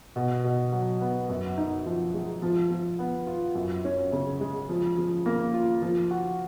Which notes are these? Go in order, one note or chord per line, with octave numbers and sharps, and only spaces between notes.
B2
B2
F#3
B3
F#2
D#4
F3
G#3
F3
F3
B3
F4
F#2
C#4
C#3
G#3
F3
F3
A#3
F4
F3
F#4